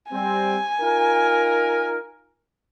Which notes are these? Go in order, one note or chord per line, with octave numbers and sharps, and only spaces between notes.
G3 C4 G#5
D#4 F4 A#4